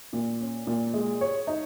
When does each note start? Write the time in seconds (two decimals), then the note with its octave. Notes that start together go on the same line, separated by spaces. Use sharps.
0.13 A#2
0.41 C#4
0.67 A#2
0.94 G#3
1.21 C#5
1.47 D#4